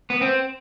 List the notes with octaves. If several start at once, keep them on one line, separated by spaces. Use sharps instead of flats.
B3
C4